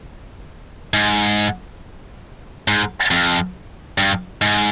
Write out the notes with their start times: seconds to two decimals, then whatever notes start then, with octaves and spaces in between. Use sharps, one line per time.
0.94 G#2
2.68 G#2
3.11 F2
3.98 G2
4.42 G#2